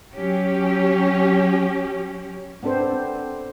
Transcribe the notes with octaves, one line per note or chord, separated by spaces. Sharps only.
F#3 C#4 G4
B3 C4 D4 A4 C5